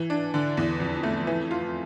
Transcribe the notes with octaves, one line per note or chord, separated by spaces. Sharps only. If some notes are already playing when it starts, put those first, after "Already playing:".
Already playing: E3
D4
D3
E2
F2
A3
E3
F4